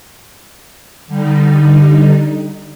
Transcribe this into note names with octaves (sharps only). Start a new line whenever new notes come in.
D3 G3 D#4